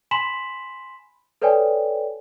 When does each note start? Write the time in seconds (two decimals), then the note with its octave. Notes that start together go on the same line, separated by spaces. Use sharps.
0.11 G#5 B5 C6 B6 E7 F#7
1.42 A4 B4 C#5 D5 G5 G#5